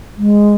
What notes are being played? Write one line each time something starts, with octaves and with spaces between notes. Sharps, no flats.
G#3